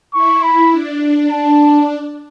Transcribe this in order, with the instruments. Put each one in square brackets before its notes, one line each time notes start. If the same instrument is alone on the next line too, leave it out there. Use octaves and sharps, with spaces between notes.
[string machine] E4 [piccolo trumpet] C#6
[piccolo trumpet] B5
[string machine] D4
[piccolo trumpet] A5